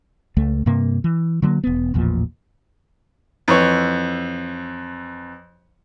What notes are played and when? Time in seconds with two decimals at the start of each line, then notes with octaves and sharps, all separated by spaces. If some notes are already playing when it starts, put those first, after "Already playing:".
0.37 C#2 A3
0.66 G2 C3 A#3
1.04 E3
1.42 D3 F#3 A3 A#3
1.64 E1 B3
1.94 A1 E2 A#2 F3
3.48 F2 E3 C#5